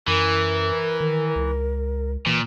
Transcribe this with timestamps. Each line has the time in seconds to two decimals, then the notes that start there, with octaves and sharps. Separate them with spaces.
0.08 F#2 E3 A#4
1.01 D#3
1.36 C#2
2.26 A#2 E3